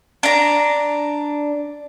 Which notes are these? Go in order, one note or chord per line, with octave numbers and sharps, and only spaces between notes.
D4 A#5